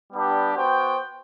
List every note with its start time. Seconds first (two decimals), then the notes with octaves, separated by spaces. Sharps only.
0.13 G3 B3 D4 G4
0.56 B3 F#4 C5 G5